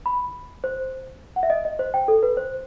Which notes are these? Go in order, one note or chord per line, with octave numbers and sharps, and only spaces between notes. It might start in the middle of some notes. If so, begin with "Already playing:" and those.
B5
C5
F#5
E5
D#5
D#5
C5
G5
A4
B4
C5